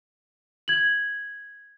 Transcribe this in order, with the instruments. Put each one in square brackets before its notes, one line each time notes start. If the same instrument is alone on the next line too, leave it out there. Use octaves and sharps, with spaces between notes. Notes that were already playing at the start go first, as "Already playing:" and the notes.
[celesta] G#6 F#7